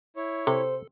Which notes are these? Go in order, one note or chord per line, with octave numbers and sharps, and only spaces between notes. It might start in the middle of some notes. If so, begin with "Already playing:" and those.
E4 C#5
C3 A4 C5